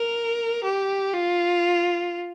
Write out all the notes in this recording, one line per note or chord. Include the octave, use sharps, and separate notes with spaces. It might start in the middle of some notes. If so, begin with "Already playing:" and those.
Already playing: A#4
G4
F4